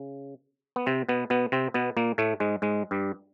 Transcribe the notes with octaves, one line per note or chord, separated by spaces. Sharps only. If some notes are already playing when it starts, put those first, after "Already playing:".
Already playing: C#3
B3
C3 C4
B2 B3
B2 B3
C3 C4
B2 B3
A#2 A#3
A2 A3
G#2 G#3
G#2 G#3
G2 G3